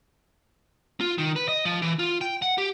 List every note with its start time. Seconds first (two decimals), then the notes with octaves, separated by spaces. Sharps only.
1.01 F4
1.18 D#3
1.36 B4
1.48 D#5
1.65 F3
1.82 E3
1.99 F4
2.21 G5
2.42 F#5
2.58 G4